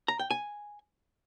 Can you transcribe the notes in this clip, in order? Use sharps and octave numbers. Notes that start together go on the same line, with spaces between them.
A#5
G5
G#5